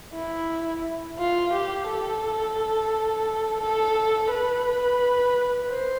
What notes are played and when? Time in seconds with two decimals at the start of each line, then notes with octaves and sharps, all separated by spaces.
0.14 E4
1.19 F4
1.53 G4
1.88 A4
3.61 A4
4.31 B4
5.69 C5